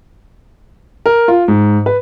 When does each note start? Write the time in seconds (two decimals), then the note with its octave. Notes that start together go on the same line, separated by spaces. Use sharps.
1.06 A#4
1.28 F4
1.48 G#2
1.86 B4